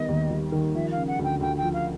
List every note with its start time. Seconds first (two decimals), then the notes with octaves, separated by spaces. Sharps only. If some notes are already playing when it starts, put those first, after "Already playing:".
Already playing: D#3 G3 B3 D#5
0.09 D#2
0.31 G3
0.52 D#3
0.75 F3 E5
0.91 F5
0.97 C#3
1.08 F#5
1.19 D2
1.24 G5
1.40 D2 G5
1.57 G5
1.62 F3
1.73 F5